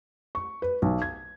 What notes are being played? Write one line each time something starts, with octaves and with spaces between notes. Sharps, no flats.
C#6
B4
B1
G#6